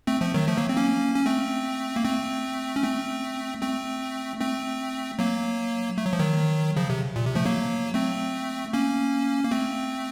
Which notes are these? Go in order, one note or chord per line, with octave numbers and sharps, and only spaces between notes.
A3 C4
F3 A3
D#3 F#3
F3 A3
F#3 A#3
C4
A#3 C#4
C#4
A3 C4
A#3
A3 C4
C#4
A3 C4
A3 C4
A3 C4
F#3 A#3
A3
F#3
F3
D#3 F#3
C#3 F3
C3
A#2
C3
F3 A3
F#3 A#3
A3 C4
A#3 C#4
A#3
A3 C4